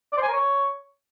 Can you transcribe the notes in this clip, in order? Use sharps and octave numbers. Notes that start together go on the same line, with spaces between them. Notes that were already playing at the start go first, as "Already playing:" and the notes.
D5
C5
G#5
A#4
C#5